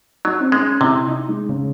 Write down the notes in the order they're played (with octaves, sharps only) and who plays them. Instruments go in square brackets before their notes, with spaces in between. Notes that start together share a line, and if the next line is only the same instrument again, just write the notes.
[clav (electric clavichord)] F#3 [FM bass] D#4
[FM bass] C4
[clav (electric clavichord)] G#3 [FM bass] C#4
[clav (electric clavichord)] C3 [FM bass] E4
[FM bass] D#4
G#3
C#3